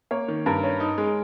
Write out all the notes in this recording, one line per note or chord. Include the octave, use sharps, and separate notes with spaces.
A#3 C#5
D#3
G2 A#4
C#4
D#4
G#3